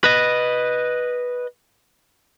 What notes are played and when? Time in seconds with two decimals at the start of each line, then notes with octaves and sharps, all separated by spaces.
0.04 B4 D#5